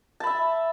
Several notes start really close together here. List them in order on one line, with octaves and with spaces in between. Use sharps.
A5 B5 E5